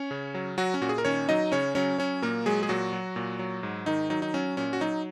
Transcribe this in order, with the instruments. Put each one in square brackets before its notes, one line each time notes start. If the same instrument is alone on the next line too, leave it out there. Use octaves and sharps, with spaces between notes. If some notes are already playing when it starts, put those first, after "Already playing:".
Already playing: [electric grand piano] C#4 C#5
C#3
F#3
F#3 F#4
C#4
A#2 F#4
G#4
A#4
D#3 C#4 C#5
F#3 D#4 D#5
C#3 C#4 C#5
F#3 C#4 C#5
F#3 C#4 C#5
A#2 A#3 A#4
F#3 G#3 G#4
G#4
A#2 F#3 F#4
F#3
A#2
F#3
G#2
D#3 D#4
F#3 D#4
D#4
F#3 C#4
A#2 C#4
F#4
F#3 D#4